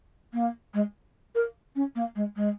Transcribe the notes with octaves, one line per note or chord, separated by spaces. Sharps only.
A#3
G#3
A#4
C#4
A#3
G#3
G#3